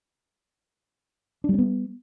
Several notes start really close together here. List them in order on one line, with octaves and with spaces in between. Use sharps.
D4 G3 C#4 B3